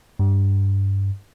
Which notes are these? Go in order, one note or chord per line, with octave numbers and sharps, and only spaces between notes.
G2